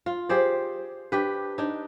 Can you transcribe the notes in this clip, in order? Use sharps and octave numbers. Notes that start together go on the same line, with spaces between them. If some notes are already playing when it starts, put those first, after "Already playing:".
F4
G4 G#4 C5 D5
D4 G4 B4
D4 D#4